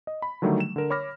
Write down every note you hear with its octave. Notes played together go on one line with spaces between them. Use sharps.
D#5
B5
D3 D#3 F#3 G3 A3
E7
D3 A#4
C#5 B5 D6 F6 A#6